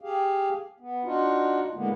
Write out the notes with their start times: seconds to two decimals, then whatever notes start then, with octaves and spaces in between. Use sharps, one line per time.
0.02 G4 G#4 F5
0.80 B3
1.04 D4 D#4 F4 F#4
1.75 A2 D3 G#3 A#3 B3